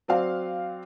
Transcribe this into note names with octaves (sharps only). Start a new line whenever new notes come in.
F#3 C4 D5 F5